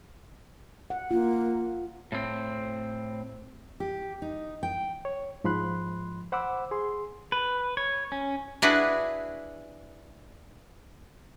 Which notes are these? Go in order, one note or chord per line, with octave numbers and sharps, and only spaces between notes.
F#5
A#3 F4
A2 C4
G4
D#4
G5
C#5
G#2 F3 B5 C6 F#6
C5 F#5 B5 D6 E6
G#4 C6
B4
C#5
C#4
D4 E4 F#4 G#4 B4